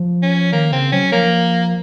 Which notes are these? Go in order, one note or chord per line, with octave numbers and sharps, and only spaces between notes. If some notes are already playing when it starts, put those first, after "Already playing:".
Already playing: F3
C#4
D#3 A#3
C#3 C4
F#3 C#4
F3 A#3